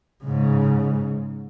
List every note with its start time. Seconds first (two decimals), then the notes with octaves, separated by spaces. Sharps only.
0.24 G#2 C#3